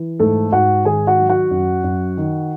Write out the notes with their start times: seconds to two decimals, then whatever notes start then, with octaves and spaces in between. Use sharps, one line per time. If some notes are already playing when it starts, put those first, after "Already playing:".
Already playing: E3
0.19 G#2 A3 A4
0.52 G#2 F#4 F#5
0.85 D#3 G#4 G#5
1.07 F#4 F#5
1.19 F#3
1.29 F#4 F#5
1.51 F#2
1.84 F#2
2.17 D#3